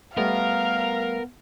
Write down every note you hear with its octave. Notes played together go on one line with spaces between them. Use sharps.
G3 A3 B3 A#4 F5